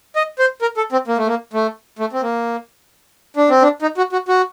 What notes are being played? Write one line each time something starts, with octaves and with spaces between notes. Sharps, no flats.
D#5
C5
A#4
A4
C4
A#3
A3
A#3
A3
A3
C4
A#3
D4
C4
D4
D#4
F#4
F#4
F#4